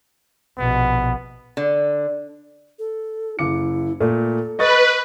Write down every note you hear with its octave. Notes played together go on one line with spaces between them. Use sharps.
A#1 B2 B3
D3
A4
F#1 E4 D6 C#7
A#2 A3 A4
B4 D#5 C#6 A6